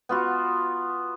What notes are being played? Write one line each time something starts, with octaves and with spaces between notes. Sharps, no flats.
B3 F4 F#4